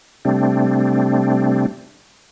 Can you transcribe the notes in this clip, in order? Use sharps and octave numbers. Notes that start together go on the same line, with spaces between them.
C3 G3 A3 C4 D4